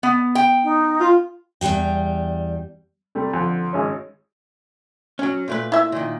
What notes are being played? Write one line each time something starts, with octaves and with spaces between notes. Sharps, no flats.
B3
G5
D#4
F4
E2 G2 E3 G3 G5
C3 G3 A3
F2 D3
G#1 G#3 C#4
F#3 C#4
A#2 A3 B4
E4 E5
A#2 D#3